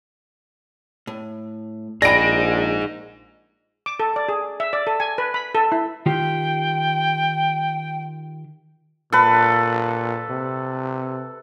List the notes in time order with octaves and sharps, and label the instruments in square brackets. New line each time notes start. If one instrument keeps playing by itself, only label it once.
[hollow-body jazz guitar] A2
[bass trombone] A#1 [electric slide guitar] D#4 G#4 [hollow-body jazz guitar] D5 G5 B5 [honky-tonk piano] A#6 D7
[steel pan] D6
A4
D5
G#4
E5
D5
A4
G#5
B4
B5
A4
E4
[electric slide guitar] D#3 F4 G4 [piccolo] G5
[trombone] A#2 [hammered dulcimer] A4 B4
[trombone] C3